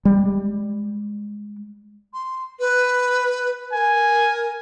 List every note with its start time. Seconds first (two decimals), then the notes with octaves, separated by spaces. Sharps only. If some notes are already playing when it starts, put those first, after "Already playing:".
0.05 G3 G#3
2.14 C6
2.59 B4
3.73 A#4 G#5